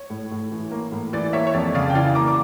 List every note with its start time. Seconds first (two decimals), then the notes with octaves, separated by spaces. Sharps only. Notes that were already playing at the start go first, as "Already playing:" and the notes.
Already playing: C#5
0.10 A2
0.32 A2
0.51 E3
0.72 A#3
0.92 A2
1.13 E3 D5
1.33 A#3 C#5 E5
1.47 C#5
1.54 F2 D5
1.75 C#3 D5 F5
1.90 G5
1.95 E3 D5 F5
2.15 A#3 A#5 D6
2.28 D6